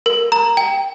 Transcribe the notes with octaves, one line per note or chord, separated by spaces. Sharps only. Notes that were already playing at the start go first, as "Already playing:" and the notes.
A#4
A#5
G5